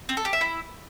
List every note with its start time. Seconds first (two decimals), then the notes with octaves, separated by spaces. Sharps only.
0.09 C4
0.17 A4
0.25 G4
0.33 E5
0.41 E4